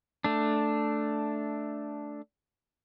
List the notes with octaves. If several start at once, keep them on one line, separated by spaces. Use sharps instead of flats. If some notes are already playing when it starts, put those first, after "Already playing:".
A3 D4